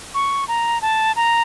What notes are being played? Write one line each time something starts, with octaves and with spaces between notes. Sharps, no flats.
C#6
A#5
A5
A#5